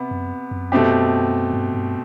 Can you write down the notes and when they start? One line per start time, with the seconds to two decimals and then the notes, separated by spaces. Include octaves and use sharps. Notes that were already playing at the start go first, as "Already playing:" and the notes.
Already playing: C3 B3
0.11 F#2
0.51 F#2
0.72 B2 A3 C4 G4
1.53 G2
1.74 G2